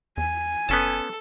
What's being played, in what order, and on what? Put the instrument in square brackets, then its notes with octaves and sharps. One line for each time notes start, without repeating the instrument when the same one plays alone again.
[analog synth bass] E2 [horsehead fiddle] G#5
[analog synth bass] F#1 [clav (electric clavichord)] B3 C#4 A5 [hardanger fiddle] A4